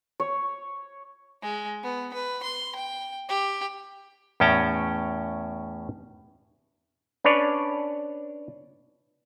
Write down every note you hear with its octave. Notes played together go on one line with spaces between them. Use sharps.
C#5
G#3
B3
B4
C6
G5
G4
E2 A2 C#4 G5 A5 A#5
C#4 D4 B4 C#5 D5